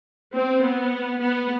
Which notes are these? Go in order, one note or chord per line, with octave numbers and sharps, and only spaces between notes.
C4
B3
B3